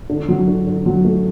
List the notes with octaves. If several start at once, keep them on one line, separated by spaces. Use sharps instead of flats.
D3
F#3
D3
D3
F#3
A3